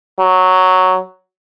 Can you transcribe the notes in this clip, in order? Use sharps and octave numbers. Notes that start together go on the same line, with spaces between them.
F#3